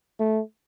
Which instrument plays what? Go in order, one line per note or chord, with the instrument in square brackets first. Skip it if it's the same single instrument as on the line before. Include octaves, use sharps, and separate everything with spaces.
[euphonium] A3